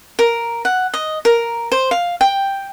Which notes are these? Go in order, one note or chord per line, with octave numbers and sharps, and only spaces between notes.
A#4
F#5
D#5
A#4
C5
F5
G5